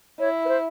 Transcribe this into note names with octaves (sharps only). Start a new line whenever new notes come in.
E4 C#5
B4
C5